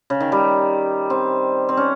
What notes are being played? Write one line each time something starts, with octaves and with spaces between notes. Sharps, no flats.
C#3
D#3
G3
C4
C4
C#4